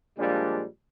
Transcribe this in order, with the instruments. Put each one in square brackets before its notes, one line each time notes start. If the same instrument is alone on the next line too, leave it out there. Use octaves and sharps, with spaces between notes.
[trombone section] A#2 F3 G3 G#3 D4